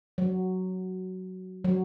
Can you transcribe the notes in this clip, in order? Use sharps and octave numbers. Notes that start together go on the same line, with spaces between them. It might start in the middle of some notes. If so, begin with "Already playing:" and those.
F#3
F#3